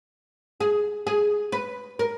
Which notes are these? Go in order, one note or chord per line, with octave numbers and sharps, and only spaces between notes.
G#4
G#4
B4
A#4